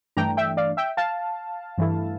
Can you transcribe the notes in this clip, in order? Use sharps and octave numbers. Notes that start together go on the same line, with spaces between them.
G2 E3 A3 D4 G5 A#5
E5 G5
D5 F5
E5 G5
F5 A5
G2 E3 A3 E4